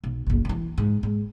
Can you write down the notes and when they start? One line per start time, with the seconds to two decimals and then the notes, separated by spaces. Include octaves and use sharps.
0.04 B1
0.27 F#1 B1
0.45 D#3 E3
0.78 G#2
1.03 G#2